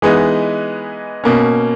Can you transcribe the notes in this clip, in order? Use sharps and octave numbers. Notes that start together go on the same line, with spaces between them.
E3 G#3 B3 D#4
B2 A#3 C#4